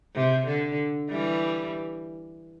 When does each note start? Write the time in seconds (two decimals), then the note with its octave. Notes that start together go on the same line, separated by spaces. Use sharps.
0.15 C3
0.47 D3
1.10 E3 G3